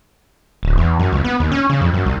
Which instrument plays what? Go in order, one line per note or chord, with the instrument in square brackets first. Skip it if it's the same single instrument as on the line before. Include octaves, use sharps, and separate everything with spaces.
[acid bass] D1
E2
F#2
C#2
B3
D#2
C#4
C#3
F2
F#2
C2